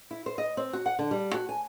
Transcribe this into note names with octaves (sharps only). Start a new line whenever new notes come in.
E4
C5
D#5
C4
F#4
F#5
D3
G3
F#4
G#5